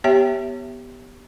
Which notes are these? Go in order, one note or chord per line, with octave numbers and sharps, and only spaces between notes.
B3 G4 C#5 E5 G5